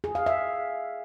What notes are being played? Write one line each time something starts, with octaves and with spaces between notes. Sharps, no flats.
G#4
F5
E5